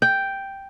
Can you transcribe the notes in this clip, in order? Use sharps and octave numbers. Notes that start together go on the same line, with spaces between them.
G5